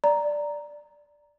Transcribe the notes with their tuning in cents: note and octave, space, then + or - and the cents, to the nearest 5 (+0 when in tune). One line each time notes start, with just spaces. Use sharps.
D5 +0 A#5 +0